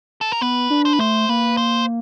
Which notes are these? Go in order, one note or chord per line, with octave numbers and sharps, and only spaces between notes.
A4
A#4
B3 B4
D4
C5
B4
A3 C5
A#3 B4
C5